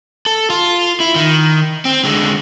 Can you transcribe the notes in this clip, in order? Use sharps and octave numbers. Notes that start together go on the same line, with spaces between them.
A4
F4
E4
D#3
C4
D3 G#3